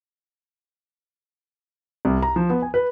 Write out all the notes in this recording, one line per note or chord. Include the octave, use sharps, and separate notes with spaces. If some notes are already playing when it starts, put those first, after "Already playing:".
C2
A#5
F3
B3
G#5
B4